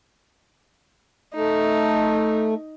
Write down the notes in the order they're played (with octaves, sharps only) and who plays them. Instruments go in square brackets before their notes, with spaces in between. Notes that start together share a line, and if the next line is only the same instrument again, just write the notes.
[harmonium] A3 [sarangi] D#4